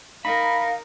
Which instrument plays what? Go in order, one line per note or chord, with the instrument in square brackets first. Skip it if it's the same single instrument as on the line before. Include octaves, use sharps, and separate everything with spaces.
[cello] D#4 A#4 [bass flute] F5 [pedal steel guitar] B5